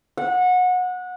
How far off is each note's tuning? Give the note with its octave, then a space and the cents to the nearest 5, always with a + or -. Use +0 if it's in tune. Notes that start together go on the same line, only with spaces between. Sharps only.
F#5 -25